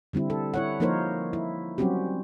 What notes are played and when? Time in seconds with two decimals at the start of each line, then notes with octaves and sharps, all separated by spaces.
0.13 D3 G3 C4 E4
0.30 A4
0.54 E4 C#5 F#5
0.80 F3 A#3 D#4 A#4 C5 C#5
1.33 E4
1.78 F#3 G3 C4 C#4 F#4 G4